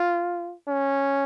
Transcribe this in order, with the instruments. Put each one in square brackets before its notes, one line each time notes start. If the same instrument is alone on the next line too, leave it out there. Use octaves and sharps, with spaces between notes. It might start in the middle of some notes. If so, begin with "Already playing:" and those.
Already playing: [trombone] F4
C#4